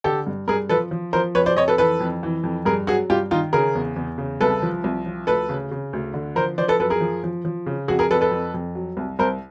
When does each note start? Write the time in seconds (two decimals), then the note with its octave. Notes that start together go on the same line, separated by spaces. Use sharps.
0.04 D3 G4 A4
0.27 G2
0.48 G2 G#4 A#4
0.69 F3 A4 B4
0.91 F3
1.13 F3 A#4 C5
1.35 F2 B4 C#5
1.46 C5 D5
1.57 F2 C#5 D#5
1.68 A4 B4
1.78 E3 A4 B4
2.00 F2
2.23 E3
2.44 F2
2.65 G2 G#4 A#4
2.87 F#3 F#4 G#4
3.10 G2 F4 G4
3.31 D#3 D#4 F4
3.53 C#3 G#4 A#4
3.75 E2
3.96 E2
4.18 C#3
4.41 C2 A4 B4
4.62 F3
4.84 C2
5.06 F3
5.27 D2 A4 B4
5.49 C#3
5.71 C#3
5.93 D2
6.14 D3
6.35 F3 A#4 C5
6.58 F3 C5 D5
6.68 A4 B4
6.79 F#2 A4 B4
6.90 G#4 A#4
7.01 F3
7.24 F3
7.45 F3
7.66 C#3
7.88 F2 F#4 G#4
7.99 G#4 A#4
8.11 F2 A4 B4
8.21 A4 B4
8.31 F2
8.54 F2
8.75 F#3
8.97 C2
9.19 C2 A#4 C5